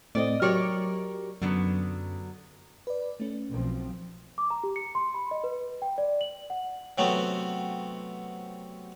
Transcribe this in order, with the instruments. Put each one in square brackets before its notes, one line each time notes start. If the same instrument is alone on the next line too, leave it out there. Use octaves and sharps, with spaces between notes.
[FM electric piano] A2 A3 C4 [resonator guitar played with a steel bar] D5 D#5
[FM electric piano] F#3 G4 [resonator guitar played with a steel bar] A#4 C#5 D5
[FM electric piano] F#2 [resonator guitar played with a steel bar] D3 F#3 B3
[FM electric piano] B4 D5
A3 C#4
[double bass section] B1 F3 C4
[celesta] D6
A#5
G4
C#7
C6
B5
D#5
B4
G5
D5
F#7
F#5
[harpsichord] C3 F#3 A3 B3 C4